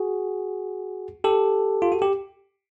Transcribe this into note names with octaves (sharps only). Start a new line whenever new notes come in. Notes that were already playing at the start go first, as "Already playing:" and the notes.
Already playing: F#4 G#4
G4 A4
F4
F#4
G4